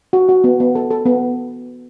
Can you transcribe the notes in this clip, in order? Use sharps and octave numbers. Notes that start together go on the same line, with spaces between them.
F#4
F#4
B3
B3
A4
A4
B3